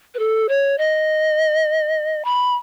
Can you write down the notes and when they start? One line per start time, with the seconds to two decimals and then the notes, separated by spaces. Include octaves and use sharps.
0.14 B4
0.19 A4
0.49 C#5
0.78 D#5
2.25 B5